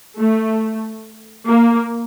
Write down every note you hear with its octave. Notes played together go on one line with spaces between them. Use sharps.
A3
A#3